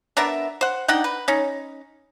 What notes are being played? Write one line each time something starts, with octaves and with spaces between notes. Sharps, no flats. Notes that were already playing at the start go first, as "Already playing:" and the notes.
B3 D4 A#4 E5
C5 F#5
D4 D#4 F#5 G5
B4
C#4 D#4